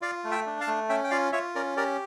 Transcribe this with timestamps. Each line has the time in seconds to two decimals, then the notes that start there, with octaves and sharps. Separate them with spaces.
0.02 F4 D5 F5
0.24 A3
0.31 E5 G5
0.46 D4
0.61 F5 A5
0.67 A3
0.89 C#4 E5 G5
1.04 G5
1.11 F4 D5 F5
1.32 F4 C#5 E5
1.55 C#4 A#4 D5
1.77 G4 A#4 D5